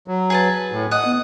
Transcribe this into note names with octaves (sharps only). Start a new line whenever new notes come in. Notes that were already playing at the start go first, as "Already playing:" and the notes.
F#3
G#4 B4 A5
A2
D#5 F#5 D#6
B3